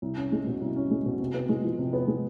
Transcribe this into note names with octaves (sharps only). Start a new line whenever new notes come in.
C2
C#4
G#3
B2
C2
C#4
G#3
B2
C3
B3
G#3
F3
C3
B3
G#3